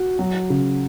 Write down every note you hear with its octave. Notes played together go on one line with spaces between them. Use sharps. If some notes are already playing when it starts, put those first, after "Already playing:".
Already playing: F#4
F#3
C#3